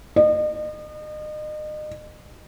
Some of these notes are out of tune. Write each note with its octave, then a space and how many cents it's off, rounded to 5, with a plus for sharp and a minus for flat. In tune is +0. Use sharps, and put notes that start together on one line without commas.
D#5 -35